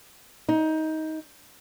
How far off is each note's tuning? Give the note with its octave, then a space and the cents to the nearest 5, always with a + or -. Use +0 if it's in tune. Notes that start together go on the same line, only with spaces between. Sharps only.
D#4 +20